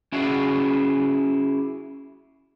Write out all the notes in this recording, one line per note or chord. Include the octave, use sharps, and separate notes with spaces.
C#4 E4 F#4 G#4 D5